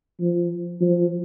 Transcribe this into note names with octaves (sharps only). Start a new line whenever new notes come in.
F3
F3